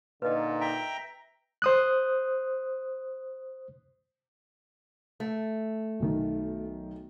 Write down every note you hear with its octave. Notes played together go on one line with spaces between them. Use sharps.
A#2 D3 D#4 B4 D#5
E5 G5 A#5
C5 D#6 F#6
A3
B1 D#3